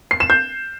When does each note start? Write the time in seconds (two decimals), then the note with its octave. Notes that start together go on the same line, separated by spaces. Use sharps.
0.11 C7
0.20 E7
0.30 G6